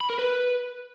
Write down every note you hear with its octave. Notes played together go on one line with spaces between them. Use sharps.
B5
A#4
B4